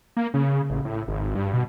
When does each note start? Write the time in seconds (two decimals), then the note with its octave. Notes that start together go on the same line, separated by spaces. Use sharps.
0.17 A#3
0.34 C#3
0.70 A1
0.85 A2
1.08 G#1
1.35 G2
1.53 B2